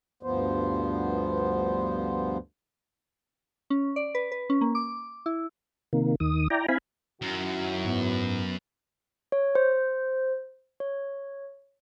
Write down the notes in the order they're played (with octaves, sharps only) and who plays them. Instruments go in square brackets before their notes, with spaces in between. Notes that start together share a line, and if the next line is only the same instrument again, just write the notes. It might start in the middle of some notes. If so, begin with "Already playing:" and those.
[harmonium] D2 G2 F3 B3 C5
[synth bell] C#4
D5
B4
B4
C#4
A#3
D6
E4
[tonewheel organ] C3 D#3 A#3
D#2 D#3 D#6
E4 D5 G5 A#5
C4 E4 F5 G#5 B5
[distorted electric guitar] F#2 [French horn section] D#3 E4 F#4
[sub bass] G#2 [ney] B3
[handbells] C#5
C5
C#5